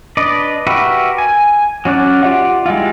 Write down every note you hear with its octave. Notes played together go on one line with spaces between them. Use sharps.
D4 B4 D5 D#5
F#4 G4 A#4 B4 E5
G#5
F#3 C#4 D5 F#6
F4 G4 D5 E5 F#5
G3 G#3 E4 F4